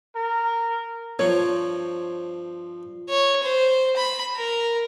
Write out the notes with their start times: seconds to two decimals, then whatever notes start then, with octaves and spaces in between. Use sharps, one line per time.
0.16 A#4
1.19 G2 F3 C4 C#5
3.10 C#5
3.43 C5
3.97 B5
4.36 A#4